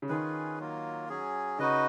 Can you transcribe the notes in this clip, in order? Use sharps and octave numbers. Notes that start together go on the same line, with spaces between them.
C#3
D#3 C#4 F4 G#4 B4
F#3 A#3 F4
F#3 C#4 G#4
C#3 D#4 F#4 B4 D#5